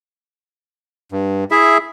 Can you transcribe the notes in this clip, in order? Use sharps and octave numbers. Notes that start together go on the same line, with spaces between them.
G2
E4 G#4 E5